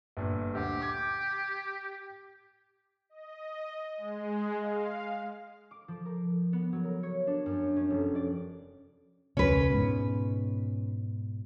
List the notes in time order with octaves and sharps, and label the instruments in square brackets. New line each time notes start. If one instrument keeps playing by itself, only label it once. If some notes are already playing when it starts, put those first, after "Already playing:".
[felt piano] G1 A#2
[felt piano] D2 [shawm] G4
[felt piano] D6 G#6
[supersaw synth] D#5
G#3
F5
[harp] D6
F3
A#4
B3
F#3
A#4
C#5
D4
F#2
C#4
F1
D5
[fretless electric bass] E1 C#2 [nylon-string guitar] C#4 B4
[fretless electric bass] G#2 B2